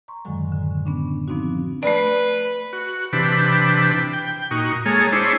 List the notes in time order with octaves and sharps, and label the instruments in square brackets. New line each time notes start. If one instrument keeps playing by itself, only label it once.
[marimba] A#5 C6 C#6
F#2 A2 D3 D#3 F#3 G#3
D3
B3 C#4 D4
F3 B3 C4 D4 D#4 F#4
[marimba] A3 D5 [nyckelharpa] B4
[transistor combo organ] F#4
C3 E3 D4 G4 B4
G5
A#2 D#4 F#4 C#6
G#3 A#3 G#4 A4 C#5 F6
D4 E4 G#4 C5 C#5